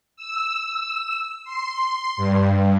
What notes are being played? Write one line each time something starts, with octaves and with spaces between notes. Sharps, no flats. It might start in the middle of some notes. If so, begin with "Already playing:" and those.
E6
C6
G2